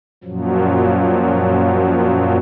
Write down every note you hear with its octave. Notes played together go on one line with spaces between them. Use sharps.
F#2 A#2 F3 F#3